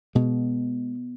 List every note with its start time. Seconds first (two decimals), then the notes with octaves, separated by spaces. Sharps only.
0.15 B2 G#3